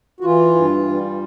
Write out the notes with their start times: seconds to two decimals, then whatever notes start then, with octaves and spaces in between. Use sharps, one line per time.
0.20 F#4
0.24 E3 F4
0.56 G2
0.87 G3